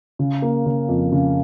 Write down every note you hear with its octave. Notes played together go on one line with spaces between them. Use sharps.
C#3
A#3
C#3
F2
C#3